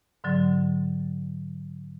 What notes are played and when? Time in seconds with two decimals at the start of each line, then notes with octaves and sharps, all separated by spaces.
0.24 G#2 D3 F#3